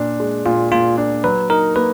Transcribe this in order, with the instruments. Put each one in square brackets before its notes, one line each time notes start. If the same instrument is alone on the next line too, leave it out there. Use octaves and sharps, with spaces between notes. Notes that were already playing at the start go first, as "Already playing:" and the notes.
Already playing: [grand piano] A#2 D4
G#3
[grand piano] A#2 [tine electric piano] F4
[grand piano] A#2 [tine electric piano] F4
[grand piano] D4
[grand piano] F#3 [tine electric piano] B4
[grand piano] D#4 [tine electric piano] A#4
[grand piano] A#3 [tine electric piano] B4